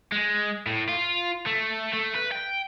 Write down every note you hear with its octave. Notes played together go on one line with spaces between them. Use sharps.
G#3
A2
F4
A3
A3
B4
G5